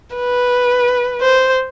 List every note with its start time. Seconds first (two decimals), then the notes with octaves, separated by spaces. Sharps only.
0.16 B4
1.21 C5